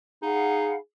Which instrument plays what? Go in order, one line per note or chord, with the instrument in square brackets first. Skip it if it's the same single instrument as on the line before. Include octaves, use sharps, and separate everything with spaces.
[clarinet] D#4 [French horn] G#4 [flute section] F5 F#5 B5